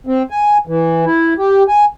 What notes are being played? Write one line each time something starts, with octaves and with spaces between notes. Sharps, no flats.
C4
G#5
E3
E4
G4
G#5